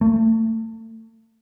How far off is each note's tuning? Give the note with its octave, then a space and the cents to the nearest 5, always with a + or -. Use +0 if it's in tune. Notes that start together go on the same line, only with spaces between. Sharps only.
A3 +30